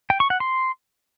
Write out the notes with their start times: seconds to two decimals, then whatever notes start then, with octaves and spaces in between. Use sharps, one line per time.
0.10 G5
0.20 C#6
0.30 F#5
0.40 C6